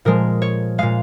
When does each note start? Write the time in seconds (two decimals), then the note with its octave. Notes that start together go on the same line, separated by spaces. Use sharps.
0.05 A#2 F3 G#3 A#4
0.42 C#5
0.78 A#2 G#3 F5